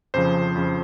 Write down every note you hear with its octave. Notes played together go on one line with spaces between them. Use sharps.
F2 C#3 F3 C5
F2 C#3 F3